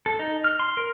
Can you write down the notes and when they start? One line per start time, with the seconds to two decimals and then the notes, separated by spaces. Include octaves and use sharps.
0.06 A4
0.19 D#4
0.44 F6
0.60 C6
0.77 A#4